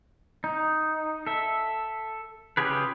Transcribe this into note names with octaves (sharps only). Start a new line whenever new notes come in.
D#4
A4 E5
C#3 F4 G4 G#4 B4